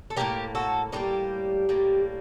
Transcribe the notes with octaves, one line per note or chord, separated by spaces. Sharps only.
A4
A2 G3 A#3 G4 A#4
F#4 A4
A2 G3 A#3 D#4 G4
A2 G3 A#3